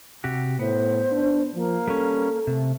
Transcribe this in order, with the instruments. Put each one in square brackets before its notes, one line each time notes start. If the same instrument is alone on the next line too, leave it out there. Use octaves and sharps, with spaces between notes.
[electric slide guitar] C3 F#4 G4
[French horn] A2 [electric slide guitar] B3 [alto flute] C5
[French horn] D4
[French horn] F3 [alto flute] A#3
[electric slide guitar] G3 C#4 [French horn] A4
[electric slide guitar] C3 [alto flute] A3